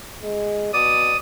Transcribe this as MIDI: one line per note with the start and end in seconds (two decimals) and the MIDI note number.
0.22 0.70 56
0.74 1.16 47
0.74 1.17 74
0.74 1.17 87